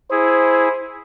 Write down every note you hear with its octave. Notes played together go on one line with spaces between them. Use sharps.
E4 G#4 C5